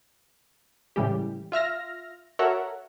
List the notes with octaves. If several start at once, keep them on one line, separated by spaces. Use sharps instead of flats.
A2 C#3 E3 G3 G#3 G4
F4 E5 F6 A#6
F#4 A4 A#4 C#5 E5 F#5